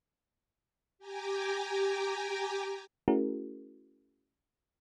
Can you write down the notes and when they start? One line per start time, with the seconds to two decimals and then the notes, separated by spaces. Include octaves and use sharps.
0.99 G4 G5 G#5 A#5 D6
3.08 A3 C#4 E4 F#4 G#4 A#4